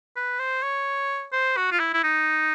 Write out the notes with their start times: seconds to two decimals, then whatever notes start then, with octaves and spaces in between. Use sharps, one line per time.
0.16 B4
0.39 C5
0.63 C#5
1.33 C5
1.57 F#4
1.72 F4
1.80 E4
1.94 E4
2.04 D#4